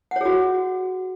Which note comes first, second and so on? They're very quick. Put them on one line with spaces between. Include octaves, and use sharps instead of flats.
F#5 C#5 G#4 F#4